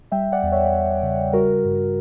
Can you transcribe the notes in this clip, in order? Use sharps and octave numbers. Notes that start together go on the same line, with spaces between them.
G3 E5 G5
D5 F#5
E2
C#5 E5
E2
C#3
G3 F#4 A#4
G2